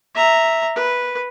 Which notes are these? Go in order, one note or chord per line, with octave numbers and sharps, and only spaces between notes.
E5 A#5
B4